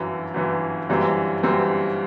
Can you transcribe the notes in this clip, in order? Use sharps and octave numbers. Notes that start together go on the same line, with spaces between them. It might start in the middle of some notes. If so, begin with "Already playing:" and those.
Already playing: G1 F#2 E3
G1 F#2 E3
G1 F#2 E3 G3 C4
G1 F#2 E3 G3 C4